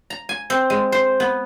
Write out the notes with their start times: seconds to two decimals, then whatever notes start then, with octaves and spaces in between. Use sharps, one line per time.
0.10 A#5
0.29 G#5
0.50 C4
0.70 G#3
0.92 C5
1.20 B3